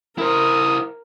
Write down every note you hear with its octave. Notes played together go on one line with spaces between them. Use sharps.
E4 A#4 C5 D#6